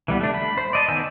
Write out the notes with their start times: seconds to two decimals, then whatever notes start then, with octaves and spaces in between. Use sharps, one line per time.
0.08 E3 G3 B3
0.21 A3 D4
0.34 B5
0.58 C5
0.73 D5 D#5 A5
0.88 D#3 B3 C5 G#5 E6